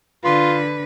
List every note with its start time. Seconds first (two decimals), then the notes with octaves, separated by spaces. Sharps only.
0.24 D3 F4 B4